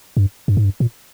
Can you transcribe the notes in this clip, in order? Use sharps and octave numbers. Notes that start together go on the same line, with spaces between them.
G2
G2
G#2
G2
A#2